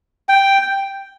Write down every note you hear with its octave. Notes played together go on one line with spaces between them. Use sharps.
G5